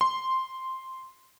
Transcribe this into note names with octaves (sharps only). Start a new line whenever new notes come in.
C6